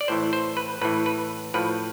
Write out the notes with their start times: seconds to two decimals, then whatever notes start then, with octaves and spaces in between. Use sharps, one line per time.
0.01 D5
0.08 A2 E3 C5
0.33 C5
0.57 B4
0.81 A2 E3 B4
1.06 B4
1.54 A2 F3 B4